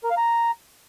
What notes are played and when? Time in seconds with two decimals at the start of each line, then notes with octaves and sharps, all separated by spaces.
0.04 A#4
0.10 F5
0.17 A#5